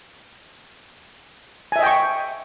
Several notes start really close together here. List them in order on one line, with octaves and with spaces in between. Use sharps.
G#5 E5 D#5 G5 C#6